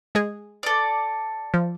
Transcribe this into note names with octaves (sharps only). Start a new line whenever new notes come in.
G#3 G#4
A4 D5
F3